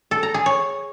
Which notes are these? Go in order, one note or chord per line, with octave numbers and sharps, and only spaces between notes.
A4
A#5
G#4
C#5